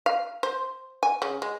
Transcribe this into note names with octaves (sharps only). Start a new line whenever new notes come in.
F5
C5
G#5
C#3
G#3